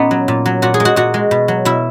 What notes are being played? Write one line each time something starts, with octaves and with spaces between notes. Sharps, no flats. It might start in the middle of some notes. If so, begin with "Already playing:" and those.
Already playing: A#2 B3 C#4 D#4
F#3
A#2
F#3
A#2 F#4
G#4
G#3
F#4
A#2 F#4
G#3
B2
F#3
B2 E4